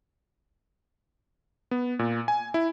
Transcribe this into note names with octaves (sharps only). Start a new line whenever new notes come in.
B3
A#2
G#5
E4